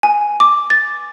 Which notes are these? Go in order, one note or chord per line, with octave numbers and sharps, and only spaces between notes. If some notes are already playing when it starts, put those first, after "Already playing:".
G#5
D6
A6